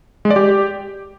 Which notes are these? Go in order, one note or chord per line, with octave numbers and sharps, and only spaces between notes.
G#3
D5
G4